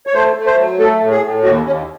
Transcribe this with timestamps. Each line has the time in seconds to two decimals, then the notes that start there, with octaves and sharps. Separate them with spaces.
0.07 C#5
0.14 A3 C5
0.36 A3
0.46 C5
0.57 F#3
0.79 A3 A4
1.00 A2
1.11 G#4
1.22 A2
1.43 D#2 F#4
1.65 D#2 C#4